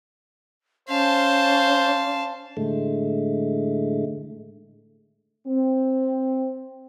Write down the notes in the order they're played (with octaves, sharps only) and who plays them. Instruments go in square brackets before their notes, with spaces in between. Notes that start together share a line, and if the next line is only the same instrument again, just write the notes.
[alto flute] C#4 [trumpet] C5 [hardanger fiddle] F5 A5
[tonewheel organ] A2 D3 G#3 A3
[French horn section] C4